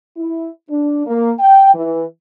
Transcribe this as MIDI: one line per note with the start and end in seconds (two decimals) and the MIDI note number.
0.17 0.49 64
0.70 1.06 62
1.07 1.32 58
1.40 1.75 79
1.75 2.04 52